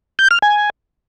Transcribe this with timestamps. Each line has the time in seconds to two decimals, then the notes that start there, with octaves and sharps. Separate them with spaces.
0.19 G6
0.31 F6
0.42 G#5